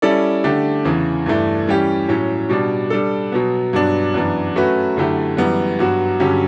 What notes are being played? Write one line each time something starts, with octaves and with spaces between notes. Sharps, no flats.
G3 C#4 E4 A4 D5
D3 A3 D4 G4
E2 C#3 E3
G2 E3 A3 D4
E3 G3 C#4 G4
A2 F#3 C#4
B2 G3 D4
G3 D4 A4
B2 F#3 B3
G2 F#3 B3 D4
F#2 E3 B3 D4
F#3 A3 C#4 F#4 B4
F#2 D3 A3 E4 G4
F#2 E3 G3 B3
G2 F#3 B3 F#4
G2 D3 F#3 C#4 G4